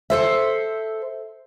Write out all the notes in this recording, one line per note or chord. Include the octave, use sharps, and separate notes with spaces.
A4 C5 E5